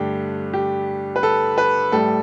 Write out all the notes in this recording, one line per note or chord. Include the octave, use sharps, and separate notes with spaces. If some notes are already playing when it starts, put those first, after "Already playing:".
Already playing: G2 D3 A3 G4
G4
B4
A4
B4
A2 G3 A4